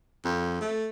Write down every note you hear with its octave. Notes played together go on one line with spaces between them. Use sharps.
F2
A3